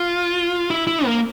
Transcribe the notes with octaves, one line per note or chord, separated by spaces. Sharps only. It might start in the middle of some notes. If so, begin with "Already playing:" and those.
Already playing: F4
E4
E4
A#3